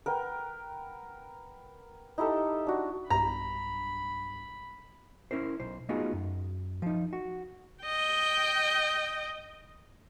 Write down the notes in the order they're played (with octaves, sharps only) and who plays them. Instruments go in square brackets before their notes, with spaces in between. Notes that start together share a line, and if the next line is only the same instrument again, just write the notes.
[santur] A#4 B4 F#5 G5
D#4 E4 G4 A4
D4 F#4
[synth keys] B1 G2 [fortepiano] A#5 [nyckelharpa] B5
[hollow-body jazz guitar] C#4 E4 A#4 C5
B1 C5
A3 B3 D#4 F4 F#4 G#4
F#2
F3 D#4
F#4
[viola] D#5 G5